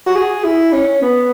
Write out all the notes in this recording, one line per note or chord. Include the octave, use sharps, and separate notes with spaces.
F#4
G#4
E4
C#4
B3